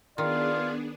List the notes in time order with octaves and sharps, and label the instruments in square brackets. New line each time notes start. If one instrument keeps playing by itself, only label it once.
[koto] D#3 [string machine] B3 D4 G#4 [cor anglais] F4 [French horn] D5